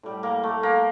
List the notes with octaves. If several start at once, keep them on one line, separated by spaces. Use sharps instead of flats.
A2 G3
A#3
A3
A#3